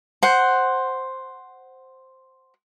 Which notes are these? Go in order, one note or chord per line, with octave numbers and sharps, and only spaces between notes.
C5 F#5